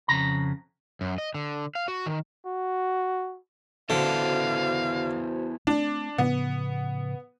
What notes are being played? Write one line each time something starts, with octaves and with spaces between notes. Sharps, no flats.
F2 A#2 C#3 A#5
F#2
D#5
D3
F5
F#4
D#3
F#4
D3 B3 E4 F#4 A4 C5 F5
A3 C4 D4
A2 C#3 F3 B3